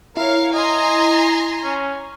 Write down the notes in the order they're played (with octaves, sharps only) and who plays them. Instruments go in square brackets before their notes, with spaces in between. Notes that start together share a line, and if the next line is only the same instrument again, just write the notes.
[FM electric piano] E4 [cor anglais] A#4 [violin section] C#5 F5
[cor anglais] D#5 [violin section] G#5 A#5 C6
[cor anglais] C#4